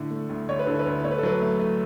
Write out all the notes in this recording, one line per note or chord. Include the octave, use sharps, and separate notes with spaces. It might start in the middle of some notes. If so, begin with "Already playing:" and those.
Already playing: A2 D3 D4
A3
D2
D2 C#5
B4
D3 A4
B4
D2
A3 C#5
B4
A4
F#3 B4
A3
A3